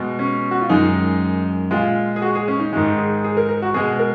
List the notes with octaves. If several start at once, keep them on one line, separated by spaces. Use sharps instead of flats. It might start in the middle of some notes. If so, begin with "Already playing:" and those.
Already playing: B2 G#3
C#4
F#4
F4
F#2 D#3 G#3 D#4
A#2 G#3 F4
G#4
F#4
G#4
C#4
D#4
G#2 D#3 G#3
G#4
G#4
A#4
A#4
F#4
B2 G#3 G#4
A#4